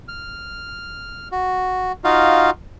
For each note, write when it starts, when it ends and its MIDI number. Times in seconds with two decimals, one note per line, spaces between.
0.08 1.28 89
1.32 1.92 66
2.04 2.50 63
2.04 2.50 65
2.04 2.50 66
2.04 2.50 77